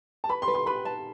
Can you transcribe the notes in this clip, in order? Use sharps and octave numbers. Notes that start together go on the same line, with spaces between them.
A5
B4 B5
C6
B4
C6
B4 B5
A5